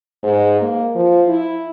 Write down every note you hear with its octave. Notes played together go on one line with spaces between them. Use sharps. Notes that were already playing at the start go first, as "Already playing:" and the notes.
G#2
A#3
F3
E4